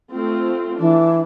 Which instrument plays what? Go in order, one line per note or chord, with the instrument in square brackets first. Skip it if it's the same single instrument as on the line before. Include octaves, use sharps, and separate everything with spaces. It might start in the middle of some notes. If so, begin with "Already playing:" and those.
[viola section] A3 C4 F4
[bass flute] E3 [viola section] D4